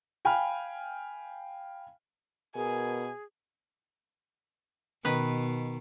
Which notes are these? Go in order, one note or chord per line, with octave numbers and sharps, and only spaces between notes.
F5 G5 G#5 B5 F6
B2 G#4 A#4 G#5
B2 D#3 B4